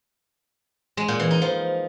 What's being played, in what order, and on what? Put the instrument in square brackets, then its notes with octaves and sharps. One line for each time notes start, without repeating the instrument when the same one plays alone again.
[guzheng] G#3
A#2
E3
D#4
F3